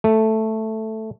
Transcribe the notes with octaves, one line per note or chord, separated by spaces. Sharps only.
A3